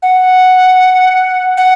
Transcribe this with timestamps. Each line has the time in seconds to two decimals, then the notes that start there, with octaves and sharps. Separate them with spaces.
0.03 F#5
1.57 F#5